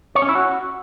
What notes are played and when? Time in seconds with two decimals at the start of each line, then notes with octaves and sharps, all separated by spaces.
0.15 C#5
0.22 C#4
0.29 E4
0.35 F#4